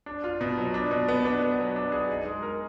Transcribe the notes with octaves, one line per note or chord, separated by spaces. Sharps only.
D4
F4
B2
F#3
D4
B2
B3
D4
B3
F#3
D4
G#4
D#4
G#3
A#4